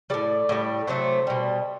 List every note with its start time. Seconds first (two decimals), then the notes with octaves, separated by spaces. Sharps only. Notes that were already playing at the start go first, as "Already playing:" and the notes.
0.10 A2 G3 D5
0.49 A2 G3
0.87 C3 F#3 A3 C5
1.27 B2 G3